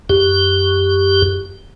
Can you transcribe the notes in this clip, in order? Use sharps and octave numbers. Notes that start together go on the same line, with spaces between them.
F#2 G4